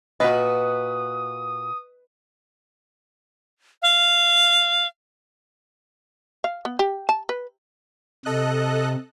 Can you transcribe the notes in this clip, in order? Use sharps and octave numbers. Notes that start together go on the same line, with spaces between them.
A#2 F#4 B4 D#5 D#6
F5
F5
B3
G4
A5
B4
C3 A4 D#5 F#6